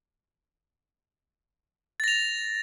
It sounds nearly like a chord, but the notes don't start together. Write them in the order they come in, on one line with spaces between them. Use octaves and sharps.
A6 A#6 F7